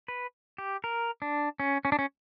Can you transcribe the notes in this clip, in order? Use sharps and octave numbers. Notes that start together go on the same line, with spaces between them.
B4
G4
A#4
D4
C#4
C#4
D4
C#4